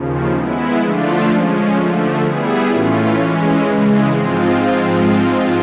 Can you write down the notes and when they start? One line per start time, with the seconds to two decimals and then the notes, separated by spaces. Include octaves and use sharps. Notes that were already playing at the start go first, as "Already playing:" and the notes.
Already playing: D#2 C#3 F3
0.34 G#3 B3 E4
0.81 D3 F3 A3 D4 F4
1.29 F3 G#3 C#4
1.75 D3 F3 A3
2.21 G3 B3 E4 G#4
2.69 A2 E3 A3 C#4 F4
3.15 E3 G#3 C#4
3.63 C#3 E3 G#3
4.09 G#2 F3 G#3 C4 F4